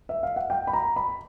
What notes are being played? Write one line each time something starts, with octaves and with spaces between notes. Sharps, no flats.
E5
F5
F#5
G5
B5
A#5
B5